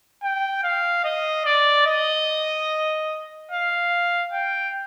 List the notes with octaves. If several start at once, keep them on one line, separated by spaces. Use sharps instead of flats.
G5
F5
D#5
D5
D#5
F5
G5